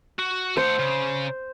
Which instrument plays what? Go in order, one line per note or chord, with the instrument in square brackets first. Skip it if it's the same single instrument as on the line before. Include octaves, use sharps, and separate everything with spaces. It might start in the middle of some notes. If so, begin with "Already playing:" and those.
[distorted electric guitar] F#4
[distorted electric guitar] A3 F#5 [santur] C5
[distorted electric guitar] C#3